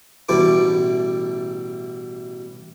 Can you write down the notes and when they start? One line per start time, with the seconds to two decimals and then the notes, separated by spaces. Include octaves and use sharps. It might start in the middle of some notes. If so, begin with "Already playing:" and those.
0.29 A1 B2 G3 E4 A4 D6